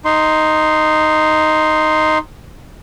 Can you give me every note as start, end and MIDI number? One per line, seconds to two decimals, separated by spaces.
0.05 2.18 63
0.05 2.18 84